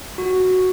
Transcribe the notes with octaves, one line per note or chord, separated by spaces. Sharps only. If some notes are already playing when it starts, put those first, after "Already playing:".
F#4